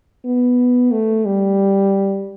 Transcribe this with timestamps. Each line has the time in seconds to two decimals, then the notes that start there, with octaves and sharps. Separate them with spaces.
0.25 B3
0.92 A3
1.25 G3